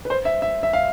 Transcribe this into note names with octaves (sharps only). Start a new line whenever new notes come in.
B4
C5
E5
E5
E5
F5